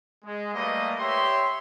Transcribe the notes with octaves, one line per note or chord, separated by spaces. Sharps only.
G#3
G3 A3 A#3 B4 D#5
G4 C#5 E5 C6